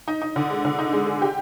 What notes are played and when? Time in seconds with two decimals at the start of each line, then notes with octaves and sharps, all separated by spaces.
0.08 D#4
0.22 D#4
0.36 D3
0.50 G#3
0.65 D3
0.78 D#4
0.93 G#3
1.07 G#4
1.22 G4